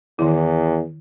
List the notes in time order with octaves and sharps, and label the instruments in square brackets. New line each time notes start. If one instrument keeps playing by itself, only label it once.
[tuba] E2 [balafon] D#3 E4